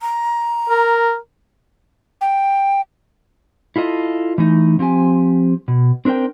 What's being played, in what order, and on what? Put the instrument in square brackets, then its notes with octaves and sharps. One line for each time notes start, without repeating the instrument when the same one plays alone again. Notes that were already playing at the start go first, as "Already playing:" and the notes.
[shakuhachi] A#5
[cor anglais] A#4
[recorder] G5
[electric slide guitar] E4 F4 A4 D#5
E3 A3 D#4
F3 C4 G4 G#5
B2
C4 D4 A#4 C5 G5